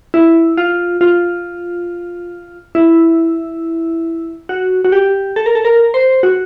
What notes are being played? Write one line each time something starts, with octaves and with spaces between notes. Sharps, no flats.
E4
F4
F4
E4
F#4
F#4
G4
A4
A#4
A4
A#4
C5
F#4